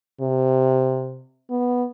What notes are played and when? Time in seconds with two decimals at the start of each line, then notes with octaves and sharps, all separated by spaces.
0.21 C3
1.50 B3